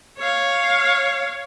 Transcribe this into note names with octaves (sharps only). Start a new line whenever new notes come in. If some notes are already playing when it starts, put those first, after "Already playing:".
C#5 F5